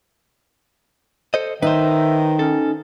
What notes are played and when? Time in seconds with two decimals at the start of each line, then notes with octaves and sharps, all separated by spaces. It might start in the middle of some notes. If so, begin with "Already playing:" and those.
1.34 A4 C5 D#5
1.62 D#3 D#4 B4 C5 E5
2.39 C#4 A4